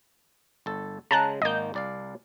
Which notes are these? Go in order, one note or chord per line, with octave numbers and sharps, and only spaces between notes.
G1 A4
C#3 G#3 A5 A#5 F#6
G#1 A#3 D#5 G6
C2 D5 F5